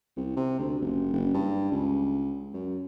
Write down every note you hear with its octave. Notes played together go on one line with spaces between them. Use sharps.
C2
C3
D2
F#1
F#1
G2
C#2
F#2